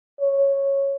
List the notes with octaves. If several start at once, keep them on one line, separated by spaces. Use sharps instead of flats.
C#5